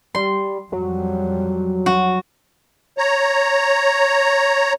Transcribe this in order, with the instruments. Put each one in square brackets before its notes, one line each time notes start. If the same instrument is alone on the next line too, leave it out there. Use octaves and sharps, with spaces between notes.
[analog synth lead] G3 [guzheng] C6
[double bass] F2 G3 [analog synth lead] F#3
[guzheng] F#4
[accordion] C#5 A#5